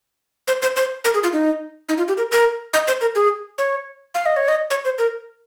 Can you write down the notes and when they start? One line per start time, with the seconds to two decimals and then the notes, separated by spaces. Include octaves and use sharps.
0.48 C5
0.62 C5
0.76 C5
1.05 A#4
1.14 G#4
1.23 F4
1.33 D#4
1.89 D#4
1.98 F4
2.08 G4
2.18 A#4
2.32 A#4
2.73 D#5
2.87 C5
3.01 A#4
3.15 G#4
3.58 C#5
4.15 F5
4.26 D#5
4.37 C#5
4.48 D#5
4.70 C#5
4.85 C5
4.98 A#4